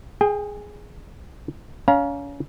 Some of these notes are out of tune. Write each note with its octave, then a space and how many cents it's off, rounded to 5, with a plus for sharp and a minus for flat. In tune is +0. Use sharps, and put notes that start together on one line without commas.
G#4 +0 G5 +35
C#4 +35 F5 +0 A#5 +35